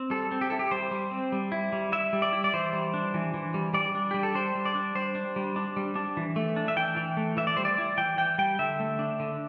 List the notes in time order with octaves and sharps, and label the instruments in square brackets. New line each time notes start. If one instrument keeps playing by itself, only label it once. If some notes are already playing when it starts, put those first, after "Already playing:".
Already playing: [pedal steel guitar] C4
G3 A4
C4
G4
E4 A4
G4
G3 C5
G3
C4
G3
E4
G3
E4 E5
G3
D5
E4
D5
E3 C5
G3
D4
E3
E3
G3
G3 D5
D4
G3 G4
A4
D4 C5
G3
D5
D4
G3 C5
D4
G3
D4
G3
D4
E3
A3
D4
E5
E3 G5
E3
A3
E3 E5
D5
G3 C5
D5
E4
E3 G5
E3 G5
G3 G5
D3 E5
A3
D4
D3